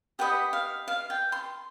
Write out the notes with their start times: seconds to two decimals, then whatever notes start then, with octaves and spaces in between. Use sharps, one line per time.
0.19 G4 B4 D#5 F#5
0.53 F5
0.88 F5
1.10 G5
1.32 C6